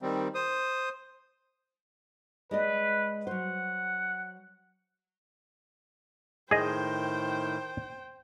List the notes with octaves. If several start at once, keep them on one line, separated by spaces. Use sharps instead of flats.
D#3 G3 C4
C5 D#6
G#3 B4 D5 D#5
F#3 C5 F#5
A2 D#3 G#4 C5 D#5 G5